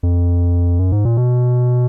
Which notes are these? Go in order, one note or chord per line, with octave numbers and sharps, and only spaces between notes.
F2
F#2
G#2
A#2
B2